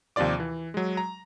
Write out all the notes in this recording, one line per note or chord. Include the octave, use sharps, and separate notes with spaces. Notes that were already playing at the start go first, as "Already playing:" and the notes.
D#2 C3 F3 F4 D5 D6
E3
F#3 G#3
A#5